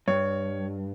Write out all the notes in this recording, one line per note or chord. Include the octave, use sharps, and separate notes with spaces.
G2 C#5